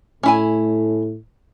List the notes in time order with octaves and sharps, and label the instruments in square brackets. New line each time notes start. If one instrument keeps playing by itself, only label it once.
[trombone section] A2 A3 [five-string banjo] C#4 E4 G#5